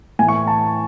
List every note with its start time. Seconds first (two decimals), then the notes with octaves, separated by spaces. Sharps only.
0.19 A2 G#5
0.23 E3
0.28 C#6
0.47 A5